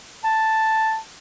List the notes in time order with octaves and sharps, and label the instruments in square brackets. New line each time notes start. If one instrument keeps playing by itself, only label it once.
[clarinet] A5